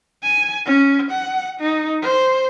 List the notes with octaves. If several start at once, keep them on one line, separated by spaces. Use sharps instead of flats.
G#5
C#4
F#5
D#4
C5